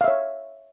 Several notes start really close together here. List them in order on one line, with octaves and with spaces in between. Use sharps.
F5 E5 C#5